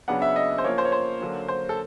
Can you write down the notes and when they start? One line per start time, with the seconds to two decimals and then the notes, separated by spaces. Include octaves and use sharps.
0.08 C#3 F#3 B3 D4 F#5
0.22 E5
0.36 D#5
0.58 C5
0.64 F3 A#3 C#4 C#5
0.78 C5
0.85 C#5
0.92 C5
1.20 D3 F#3 A#3 C#4
1.48 C5
1.69 A4